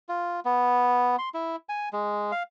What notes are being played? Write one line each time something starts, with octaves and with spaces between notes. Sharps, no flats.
F4
B3
C6
E4
G#5
G#3
F5